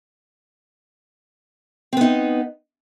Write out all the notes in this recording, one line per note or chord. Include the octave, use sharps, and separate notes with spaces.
B3 C4 D#4